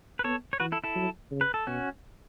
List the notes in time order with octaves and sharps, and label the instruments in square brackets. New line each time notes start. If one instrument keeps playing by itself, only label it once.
[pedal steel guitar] B4
[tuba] B3 [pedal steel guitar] A4 C#5
[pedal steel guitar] C#5
[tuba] E3 [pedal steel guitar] F#4 B4
[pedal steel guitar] E4 A4
E4 A4
[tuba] F#3
C#3
[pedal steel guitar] B4
A4
[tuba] B2 [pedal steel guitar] C#4 F#4